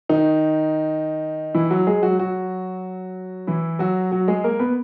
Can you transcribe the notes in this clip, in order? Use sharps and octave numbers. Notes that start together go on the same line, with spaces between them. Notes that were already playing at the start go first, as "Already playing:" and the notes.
D#3 D#4
E3 E4
F#3 F#4
G#3 G#4
F#3 F#4
F#3 F#4
E3 E4
F#3 F#4
F#3 F#4
G#3 G#4
A#3 A#4
B3 B4